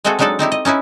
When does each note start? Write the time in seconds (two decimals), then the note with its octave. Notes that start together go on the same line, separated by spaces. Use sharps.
0.04 G#3 A3 C4 F#4 G#4 A4
0.19 F#3 G#3 D4 D#4 A4 D5
0.39 C4 D#4 E4 G4
0.52 D#5
0.65 C#4 D#4 E4 B4